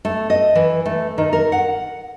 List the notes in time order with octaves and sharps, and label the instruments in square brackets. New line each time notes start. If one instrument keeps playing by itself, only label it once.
[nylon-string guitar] A3
D#5
E3
A3
D#3
A#4
F#5